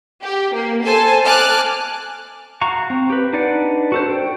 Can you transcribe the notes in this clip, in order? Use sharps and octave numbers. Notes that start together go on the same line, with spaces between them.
G4
A#3
A4 C5 G#5 A5
G#5 A5 D6 F6 F#6
F#4 F5 A#5 C#6
C4
G4 B4
D4 D#4 B4 D5 F#5
F#4 A4 C5
G5